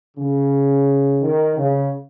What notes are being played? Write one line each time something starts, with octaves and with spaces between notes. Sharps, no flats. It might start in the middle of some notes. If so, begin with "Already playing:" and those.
C#3
D#3
C#3